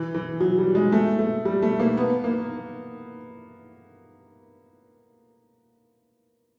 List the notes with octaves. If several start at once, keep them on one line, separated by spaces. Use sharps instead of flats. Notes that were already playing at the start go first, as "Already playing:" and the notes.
Already playing: E3
E3
F#3
G3
G#3
A3
A3
G3
A3
A#3
B3
A#3